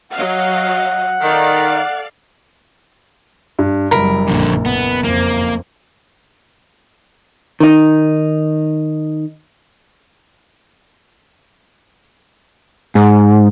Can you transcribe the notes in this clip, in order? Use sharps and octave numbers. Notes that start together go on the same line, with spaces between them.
F#3 D#5 F5 F#5
D#3 A4 D5 F5
G2
F#1 F#3 G3 A#4 B5
A#1 F2 D3
B3
F2 F3 A#3
D#3 D#4
G#2